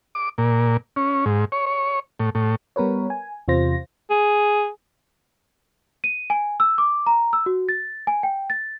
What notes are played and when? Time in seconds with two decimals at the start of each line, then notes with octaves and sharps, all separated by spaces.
0.15 D6
0.38 A#2
0.96 C#4
1.26 G#2
1.52 C#5
1.66 C#5
2.20 A2
2.35 A2
2.76 G3 B3 A#4 B4 C#5
3.10 G#5
3.48 E2 C3 F4 C5 A#6
4.10 G#4
6.04 D#7
6.30 G#5
6.60 E6
6.78 D6
7.07 A#5
7.33 E6
7.46 F#4
7.69 A6
8.07 G#5
8.23 G5
8.50 A6